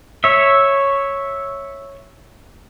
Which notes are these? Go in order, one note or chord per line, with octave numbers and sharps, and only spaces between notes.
C#5 E5